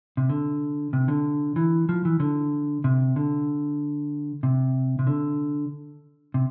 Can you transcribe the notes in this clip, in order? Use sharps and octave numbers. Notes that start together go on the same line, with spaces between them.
C3
D3
C3
D3
E3
F3
E3
D3
C3
D3
C3
C3
D3
C3